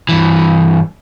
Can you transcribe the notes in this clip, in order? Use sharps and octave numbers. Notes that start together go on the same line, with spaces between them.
G2 E3